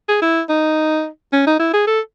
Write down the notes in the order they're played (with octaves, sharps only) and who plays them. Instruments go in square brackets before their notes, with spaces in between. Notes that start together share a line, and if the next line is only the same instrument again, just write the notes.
[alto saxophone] G#4
E4
D#4
C#4
D#4
E4
G#4
A4